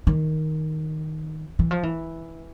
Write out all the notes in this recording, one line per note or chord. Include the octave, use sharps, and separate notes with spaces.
D#3
E3
F3
E3